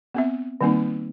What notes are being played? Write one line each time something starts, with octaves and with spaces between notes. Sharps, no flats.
B3 C4 E5
D#3 G3 A#3 C4 D#4